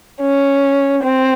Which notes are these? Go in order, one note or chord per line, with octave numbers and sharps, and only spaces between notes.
C#4
C4